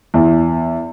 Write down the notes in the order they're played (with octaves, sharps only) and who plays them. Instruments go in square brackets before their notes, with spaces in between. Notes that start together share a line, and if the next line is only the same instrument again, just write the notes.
[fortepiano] E2